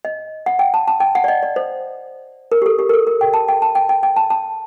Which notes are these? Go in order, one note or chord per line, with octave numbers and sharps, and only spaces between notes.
D#5
F#5
G5
A5
A5
G5
F#5
D5
D#5
D5
C5
A#4
G4
A4
G4
A#4
A4
A#4
G5
A5
G5
A5
G5
G5
G5
A5
A5